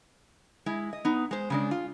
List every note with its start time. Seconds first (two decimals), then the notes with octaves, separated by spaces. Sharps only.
0.66 G#3 E4
0.93 D#5
1.05 B3 D#4
1.31 G#3 C5
1.50 C#3 G#3 D4
1.71 F4